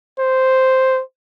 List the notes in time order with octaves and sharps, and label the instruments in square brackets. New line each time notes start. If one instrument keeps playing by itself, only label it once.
[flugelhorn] C5